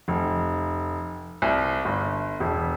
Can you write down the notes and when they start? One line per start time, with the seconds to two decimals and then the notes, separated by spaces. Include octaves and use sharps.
0.08 F1
1.42 C2
1.85 G1
2.40 E1